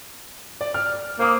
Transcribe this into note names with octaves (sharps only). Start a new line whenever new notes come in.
D5
F6
A#3 C5 D6 D#6